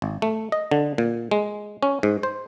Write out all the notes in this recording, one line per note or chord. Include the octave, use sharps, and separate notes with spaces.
G#1
A3
D#5
D3
A#2
G#3
C#4
G#2
C5